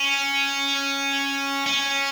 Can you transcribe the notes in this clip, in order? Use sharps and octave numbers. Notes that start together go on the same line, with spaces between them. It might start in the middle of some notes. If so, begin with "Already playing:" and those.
Already playing: C#4
C#4